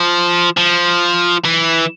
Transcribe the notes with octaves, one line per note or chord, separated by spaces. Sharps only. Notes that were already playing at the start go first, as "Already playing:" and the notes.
Already playing: F3
F3
E3